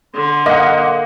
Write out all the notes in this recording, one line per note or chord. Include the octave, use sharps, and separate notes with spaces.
D3 C6
A#3 D#5 F#5